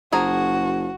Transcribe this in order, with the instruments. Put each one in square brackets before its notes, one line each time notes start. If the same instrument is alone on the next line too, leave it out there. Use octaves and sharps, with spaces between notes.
[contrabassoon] F#1 [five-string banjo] F3 G#4 A#5 [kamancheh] F#4